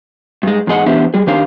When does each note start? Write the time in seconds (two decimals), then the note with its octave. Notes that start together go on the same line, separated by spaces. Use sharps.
0.43 G2 G#3
0.67 E2 G#2 G#4 D#5 F#5
0.86 E3 B3 D4 G4 C5 E5
1.14 G3 G#4
1.27 D#3 D4 G4 C5 F5